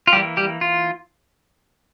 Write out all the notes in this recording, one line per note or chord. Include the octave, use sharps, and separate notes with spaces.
F4
E3 G3 A#3 G4
G3 G4
F4